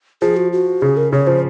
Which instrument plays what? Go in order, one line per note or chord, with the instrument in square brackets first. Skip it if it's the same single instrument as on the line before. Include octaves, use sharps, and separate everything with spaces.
[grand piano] F3 [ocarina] G#4
[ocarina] F#4
F#4
[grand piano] C#3 [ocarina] G#4
[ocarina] A#4
[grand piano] C#3 [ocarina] C#5
[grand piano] F3 [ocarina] C5